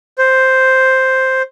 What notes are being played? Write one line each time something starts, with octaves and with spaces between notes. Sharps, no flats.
C5